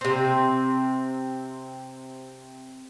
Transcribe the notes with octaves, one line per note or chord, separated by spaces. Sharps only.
C3 C4